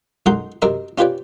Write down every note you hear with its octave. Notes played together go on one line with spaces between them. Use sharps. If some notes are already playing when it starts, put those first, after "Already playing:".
B1 F#2 G#3 D#4 F#5 C6
F#2 C3 C4 A#4 D#5 A#5
C#4 F4 G4 B4 C#5 D5